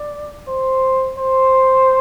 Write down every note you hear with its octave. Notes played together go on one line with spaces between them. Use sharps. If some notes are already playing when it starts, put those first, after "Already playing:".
Already playing: D5
C5
C5